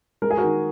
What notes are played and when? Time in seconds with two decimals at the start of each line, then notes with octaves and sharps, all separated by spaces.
0.22 G#3 A#4
0.30 G#4
0.37 F#4 A#4
0.43 D#3